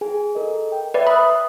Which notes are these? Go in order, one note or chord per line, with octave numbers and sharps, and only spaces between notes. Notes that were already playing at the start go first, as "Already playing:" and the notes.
G#4 G#5
A4 A#4 D#5
G5
B4 D5 E5
B5 D#6 E6 F#6